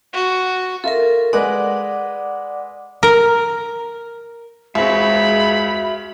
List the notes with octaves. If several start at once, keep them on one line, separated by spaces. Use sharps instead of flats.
F#4
F4 A4 A#4 E5
G#3 B4 D5 D#5 F#5 D6
A#4
C#2 G#3 C4 F#4 E5 B5